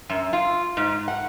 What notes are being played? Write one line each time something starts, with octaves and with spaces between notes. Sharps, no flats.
F#2
F4
G#2
F#5